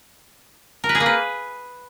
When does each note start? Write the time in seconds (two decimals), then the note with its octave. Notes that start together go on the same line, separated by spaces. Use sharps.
0.84 A#4
0.89 B4
0.95 G#4
1.00 A#3
1.06 B4